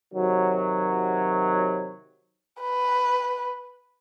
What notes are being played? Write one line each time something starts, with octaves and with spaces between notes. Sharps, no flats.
C3 D#3 F#3
B4